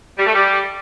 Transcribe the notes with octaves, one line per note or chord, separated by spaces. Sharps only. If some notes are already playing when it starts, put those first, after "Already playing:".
G3
A3
G3